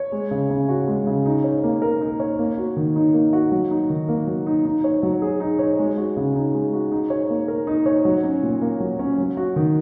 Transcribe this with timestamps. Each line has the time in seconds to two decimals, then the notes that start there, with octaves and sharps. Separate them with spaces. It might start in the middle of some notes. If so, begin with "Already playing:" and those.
Already playing: C#5
0.12 G#3
0.31 C#3
0.50 C#3
0.69 F#4
0.88 G#3
1.07 C#3
1.26 D#4
1.44 C#5
1.64 A#3
1.82 A#4
2.01 D#4
2.20 C#5
2.39 A#3
2.58 F#4
2.77 D#3
2.96 D#4
3.14 A#3
3.33 F#4
3.52 F#3
3.71 D#4
3.90 D#3
4.09 A#3
4.27 F#3
4.47 D#4
4.65 D#4
4.84 C#5
5.03 F#3
5.22 G#4
5.40 D#4
5.59 C#5
5.79 G#3
5.98 F#4
6.17 C#3
6.36 D#4
6.54 G#3
6.73 F#4
6.92 D#4
7.10 C#5
7.30 A#3
7.48 A#4
7.67 D#4
7.86 C#5
8.05 F#3
8.24 C#4
8.43 A#2
8.62 A#3
8.80 F#3
8.99 C#4
9.18 F#3
9.37 F#4
9.56 D#3